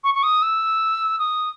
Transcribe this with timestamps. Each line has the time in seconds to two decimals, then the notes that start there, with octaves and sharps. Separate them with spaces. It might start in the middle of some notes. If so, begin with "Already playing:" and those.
0.04 C#6
0.14 C#6
0.23 D#6
0.42 E6
1.19 D#6